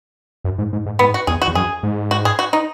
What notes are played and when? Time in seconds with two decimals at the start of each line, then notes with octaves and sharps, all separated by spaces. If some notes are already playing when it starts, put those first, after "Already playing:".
0.44 F#2
0.58 G#2
0.73 G#2
0.86 G#2
0.99 G#2 B3
1.14 F#4
1.27 E2 G#4
1.42 F#4
1.47 E2
1.55 F#2 G#4
1.83 G#2
2.11 F#4
2.25 G#4
2.39 F#4
2.53 D#4